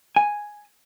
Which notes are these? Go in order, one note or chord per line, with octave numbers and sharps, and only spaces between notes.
G#5